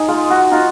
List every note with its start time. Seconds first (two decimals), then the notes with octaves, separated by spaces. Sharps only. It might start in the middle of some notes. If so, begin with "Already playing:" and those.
Already playing: D#4 G#4
0.08 G#3 F4
0.30 F#4
0.52 D#4 F4